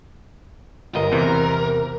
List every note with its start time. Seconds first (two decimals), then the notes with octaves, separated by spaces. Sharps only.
0.95 G1 A#4 D#5
1.12 E2 C3 E3